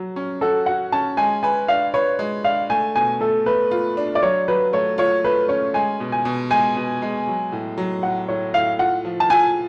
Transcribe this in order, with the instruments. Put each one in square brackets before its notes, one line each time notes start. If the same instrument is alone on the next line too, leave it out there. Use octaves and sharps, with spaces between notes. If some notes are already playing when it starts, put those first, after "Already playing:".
Already playing: [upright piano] F#3 F#4
C#4
[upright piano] F#4 [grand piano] A4
[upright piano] F#4 [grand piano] F#5
[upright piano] C#4 [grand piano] A5
[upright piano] G#3 [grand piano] G#5
[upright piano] B4 [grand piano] G#5
[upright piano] D4 [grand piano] F5
[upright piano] B4 [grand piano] C#5
[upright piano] G#3
[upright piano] D4 [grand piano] F5
[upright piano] A3 [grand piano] G#5
[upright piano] B2 [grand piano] G#5
[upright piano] A3 [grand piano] A4
[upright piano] A3 [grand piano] B4
[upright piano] F4
D4
[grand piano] D5
[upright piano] F#3 [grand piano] C#5
[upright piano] F#3 [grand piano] B4
[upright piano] A3 [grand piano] C#5
[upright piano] F4 [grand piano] C#5
[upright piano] A3 [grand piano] B4
[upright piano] C#4 [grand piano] C#5
[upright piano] G#3 [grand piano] G#5
[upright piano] B2
[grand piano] G#5
[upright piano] B2
[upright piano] G#3 [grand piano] G#5
[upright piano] B2
G#3
F#3
A2
F#3
[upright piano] A2 [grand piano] F#5
[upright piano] A2 [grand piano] C#5
[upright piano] A2 [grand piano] F5
[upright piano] F4 [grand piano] F#5
[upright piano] F3
[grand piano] A5
[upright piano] F4 [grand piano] G#5